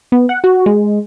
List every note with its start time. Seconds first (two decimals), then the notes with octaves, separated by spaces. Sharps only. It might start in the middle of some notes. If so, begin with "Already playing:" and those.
0.12 B3
0.29 F#5
0.44 F#4
0.66 G#3